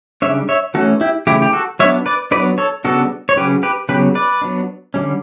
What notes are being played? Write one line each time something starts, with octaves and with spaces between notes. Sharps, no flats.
C#3 G3 D4 C#5 E5
C#5 E5
E3 A3 C#4 F#4 A4
E4 G4
C#3 E3 A3 E4 G4
G4
F#4 A4
F#3 B3 D4 C#5 E5
B4 D5
F#3 B3 D4 B4 D5
A4 C#5
C#3 G3 B3 D4 F#4 A4
C#5
C#3 F#3 C#4 G4 B4
G4 B4
C#3 F#3 B3 G4 B4
B4 D5
F#3 B3 D4
D3 G3 C#4